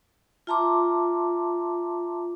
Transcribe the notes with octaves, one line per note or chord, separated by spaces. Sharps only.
F4 E5 A5 A#5 C6 D6